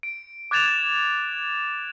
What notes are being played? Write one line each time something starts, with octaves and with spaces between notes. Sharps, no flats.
D7
D6 F#6 G#6 A6 E7 F7